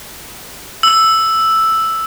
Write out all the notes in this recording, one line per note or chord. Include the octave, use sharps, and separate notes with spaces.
E6